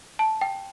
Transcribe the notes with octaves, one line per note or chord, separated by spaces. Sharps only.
A5
G5